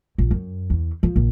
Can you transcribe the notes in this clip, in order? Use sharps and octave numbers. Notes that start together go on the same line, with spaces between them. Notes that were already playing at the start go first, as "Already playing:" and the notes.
A#1
F#2
E2
F3
A#1